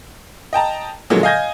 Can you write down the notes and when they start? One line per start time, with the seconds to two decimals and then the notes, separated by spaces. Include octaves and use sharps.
0.53 D#5 G5 A5 A#5
1.10 A#2 D3 F3 F#3 G#3 A#3
1.23 D#5 F5 G#5 G6 G#6 A#6